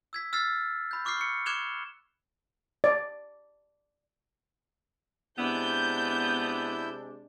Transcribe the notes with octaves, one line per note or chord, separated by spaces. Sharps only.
E6 G#6 B6
E6 F6 A6 C7
B5 G6
C#6 D6 F6 G6 C7
C#6 C#7
D6 F#6 G#6 E7 F7 G7
D5
C3 G#3 B3 D4 E4 E6 G6